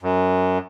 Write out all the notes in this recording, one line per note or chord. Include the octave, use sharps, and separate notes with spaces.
F#2